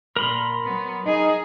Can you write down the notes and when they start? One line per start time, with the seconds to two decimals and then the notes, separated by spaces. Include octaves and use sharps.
0.16 A#2 A#4 B5 C6
0.63 F#3 B3
1.06 D#4 G#4